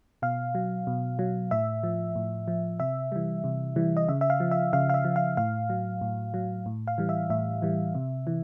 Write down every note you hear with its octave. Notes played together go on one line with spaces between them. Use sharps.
B2 F5
F#3
B2
F#3
A2 E5
F3
A2
F3
C3 E5
E3 G3
C3
E3 G3
D#5
C#3 E5
E5
F5
F3
E5
C#3 F5
F5
E5
F3
F5
A2 F5
F#3
A2
F#3
A2
F5
E3 G3
E5
A2 E5
E3 G3
C3
E3